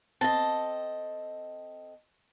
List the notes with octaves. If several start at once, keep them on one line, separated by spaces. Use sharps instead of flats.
C4 A4 D#5 A5